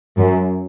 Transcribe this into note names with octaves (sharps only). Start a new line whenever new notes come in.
F#2